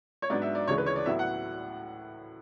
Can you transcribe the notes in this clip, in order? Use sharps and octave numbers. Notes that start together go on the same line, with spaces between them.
C#5
G#2 F#3 B3 D4 D5
E5
D5
D2 C#3 E3 G#3 C#5
B4
C#5
D5
A2 F#3 B3 E4 E5
F#5